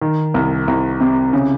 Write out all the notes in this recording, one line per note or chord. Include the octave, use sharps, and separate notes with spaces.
D#3
C2
C2
C3
C#3